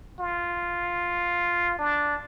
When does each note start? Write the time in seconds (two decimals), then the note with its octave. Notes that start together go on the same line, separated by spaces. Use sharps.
0.19 F4
1.79 D4